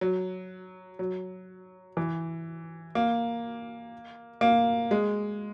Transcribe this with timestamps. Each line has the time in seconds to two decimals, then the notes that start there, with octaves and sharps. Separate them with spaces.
0.01 F#3
0.99 F#3
1.97 E3
2.95 A#3
4.41 A#3
4.91 G#3